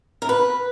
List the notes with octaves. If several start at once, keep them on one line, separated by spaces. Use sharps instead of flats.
A#4
B4